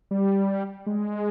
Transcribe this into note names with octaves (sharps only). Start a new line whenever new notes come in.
G3
G#3